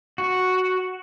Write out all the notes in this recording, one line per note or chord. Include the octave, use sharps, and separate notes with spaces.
F#4